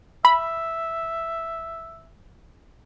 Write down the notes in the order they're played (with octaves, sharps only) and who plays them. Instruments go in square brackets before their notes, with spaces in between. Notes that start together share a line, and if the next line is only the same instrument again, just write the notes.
[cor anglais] E5 [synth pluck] B5